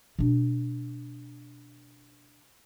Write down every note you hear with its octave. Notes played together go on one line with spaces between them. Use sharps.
B2 D4